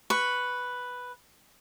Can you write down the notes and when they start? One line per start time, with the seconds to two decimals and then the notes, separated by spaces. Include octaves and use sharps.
0.10 B4 C#6